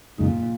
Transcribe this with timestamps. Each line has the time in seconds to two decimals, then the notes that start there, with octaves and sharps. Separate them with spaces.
0.18 F#2 A#2 C#3 G#3 D#4